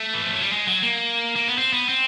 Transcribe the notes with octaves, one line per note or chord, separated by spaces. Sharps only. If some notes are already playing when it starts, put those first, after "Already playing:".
Already playing: A3
E3
F3
F#3
G3
G#3
F#3
A#3
A#3
B3
C4
B3
C4